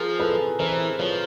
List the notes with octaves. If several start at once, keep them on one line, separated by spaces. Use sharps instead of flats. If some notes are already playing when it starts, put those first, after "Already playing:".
Already playing: F3 G#4 A#4
A4 B4
E3 A#4 C5
F3 B4 C#5